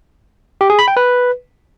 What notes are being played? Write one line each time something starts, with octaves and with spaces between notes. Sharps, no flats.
G4
G#4
B5
G5
B4